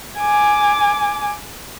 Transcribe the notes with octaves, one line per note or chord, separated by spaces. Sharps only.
G#5 D6